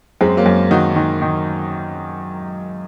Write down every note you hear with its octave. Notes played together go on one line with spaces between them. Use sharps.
F#2 G#3 C4
F#3 A#3
F#2
D#3 D#4 F#4
D#3
D#3